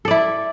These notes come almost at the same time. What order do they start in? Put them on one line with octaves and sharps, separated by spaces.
A4 D5 E4